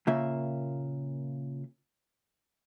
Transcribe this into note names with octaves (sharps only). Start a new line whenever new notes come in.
A#2 C#3 A#3 F4 E5